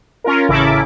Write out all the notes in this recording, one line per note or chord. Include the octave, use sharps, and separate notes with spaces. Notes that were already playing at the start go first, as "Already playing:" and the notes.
C#4 F4 A#4
A1 C#3 E4 A4 A#4 D6